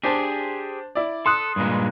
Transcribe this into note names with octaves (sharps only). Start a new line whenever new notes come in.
D4 G4 G#4 C5 A5
E4 D5
A4 C6 D#6 F#6
G2 A#2 G#3